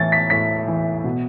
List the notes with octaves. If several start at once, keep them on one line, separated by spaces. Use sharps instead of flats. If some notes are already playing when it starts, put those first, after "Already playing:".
Already playing: A2 E3 A6
B6
A2 B6
E3
B2